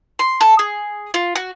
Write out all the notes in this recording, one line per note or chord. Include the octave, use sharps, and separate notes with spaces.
C6
A4
G#4
F4
F#4